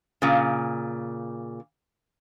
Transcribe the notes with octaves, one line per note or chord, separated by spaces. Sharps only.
A#2 C#3